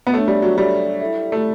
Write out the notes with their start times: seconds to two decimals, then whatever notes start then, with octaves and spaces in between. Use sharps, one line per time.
0.07 B3
0.13 A3 D4 A4 C#5 E5
0.28 G3
0.42 F#3
0.57 G3 D4 A4 C#5 E5
1.01 E4 A4 E5
1.32 A3